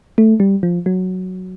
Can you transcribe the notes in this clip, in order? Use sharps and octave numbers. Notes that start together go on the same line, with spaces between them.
A3
G3
F3
F#3